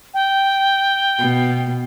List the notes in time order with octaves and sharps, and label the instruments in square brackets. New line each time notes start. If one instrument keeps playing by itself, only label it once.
[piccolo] G5
[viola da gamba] B2